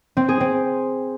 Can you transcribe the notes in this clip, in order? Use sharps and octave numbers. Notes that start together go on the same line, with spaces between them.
C4
G#4
C4